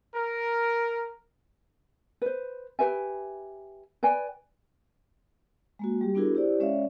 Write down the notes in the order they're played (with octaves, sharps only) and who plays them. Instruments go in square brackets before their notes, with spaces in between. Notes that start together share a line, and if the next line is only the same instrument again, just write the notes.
[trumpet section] A#4
[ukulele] B4 C5
G4 B4 E5 G#5
B4 D5 G5 G#5
[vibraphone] G#3 A#3 F#4
G3 G4
B3 D4 E4 F#4 G#4 A#4
E4 G4 C5 D5
G#3 C#4 C#5 D5 E5 F5